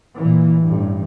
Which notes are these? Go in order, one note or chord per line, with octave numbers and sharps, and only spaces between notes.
A#2 E3
A1 G2